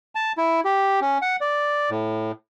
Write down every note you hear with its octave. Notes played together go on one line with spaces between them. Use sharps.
A5
E4
G4
C#4
F#5
D5
A2